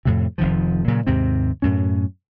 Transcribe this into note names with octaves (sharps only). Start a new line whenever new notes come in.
F2 A2 C3
F1 F2 D#3 F3
A#2 C#3 F#3
D#2 G#2 C3 C4
F#2 A2 C#4